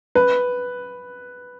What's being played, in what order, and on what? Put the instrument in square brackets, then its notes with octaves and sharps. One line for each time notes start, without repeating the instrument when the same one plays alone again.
[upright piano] B4